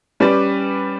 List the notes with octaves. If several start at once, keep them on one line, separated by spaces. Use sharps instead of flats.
G3 C#4 G4 B4 D5